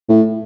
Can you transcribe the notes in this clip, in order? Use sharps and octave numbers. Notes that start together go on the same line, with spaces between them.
A2